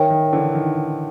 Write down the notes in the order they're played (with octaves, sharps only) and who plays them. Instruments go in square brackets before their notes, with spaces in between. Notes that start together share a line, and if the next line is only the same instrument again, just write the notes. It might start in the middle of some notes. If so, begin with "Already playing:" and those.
Already playing: [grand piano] D#3 [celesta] A#4 C#5 E5 G5
[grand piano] D#3
D3 E3
D#3